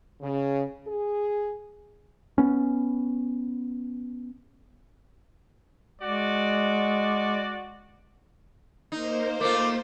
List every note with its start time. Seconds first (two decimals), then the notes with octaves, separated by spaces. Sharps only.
0.21 C#3
0.86 G#4
2.38 B3 C#4
6.01 G#3 F#4 D5
8.92 A#3 D#4 C5
9.41 A3 F4 D6